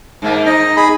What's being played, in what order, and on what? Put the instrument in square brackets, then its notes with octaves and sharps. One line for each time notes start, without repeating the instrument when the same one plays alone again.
[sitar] G#2 A#3
[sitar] D#4 [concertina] D#5
[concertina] G#4 B5